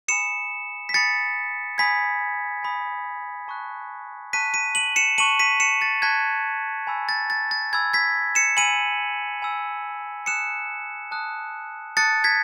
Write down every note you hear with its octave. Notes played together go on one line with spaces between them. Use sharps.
G#5 B5 D#6 C#7 E7
B6
G#5 B5 D#6 A6 C#7
G#5 B5 D#6 G#6 B6
G#5 B5 D#6
A5 C#6 F#6
A5 C#6 F#6 B6 D#7
B6 D#7
D#7 F#7
C#7 E7
A5 C#6 F#6 D#7 F#7
B6 D#7
C#7 E7
A6 C#7
A5 C#6 F#6 G#6 B6
G#5 B5 E6
A6
A6
A6
G#5 B5 E6 G#6
G#6 B6
C#7 E7
G#5 B5 E6 D#7 F#7
G#5 B5 E6
A5 D#6 F#6 C#7 E7
A5 D#6 F#6
A5 D#6 F#6 A6 C#7
G#6 B6